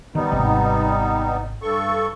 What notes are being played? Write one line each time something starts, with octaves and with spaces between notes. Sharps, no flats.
D#3 G3 B3 D#4
G#1 C3
G2 A4 C#6